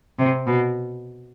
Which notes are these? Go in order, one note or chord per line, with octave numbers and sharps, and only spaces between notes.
C3
B2